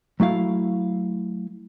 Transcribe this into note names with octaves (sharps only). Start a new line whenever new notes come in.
F#3 A3 E4 F5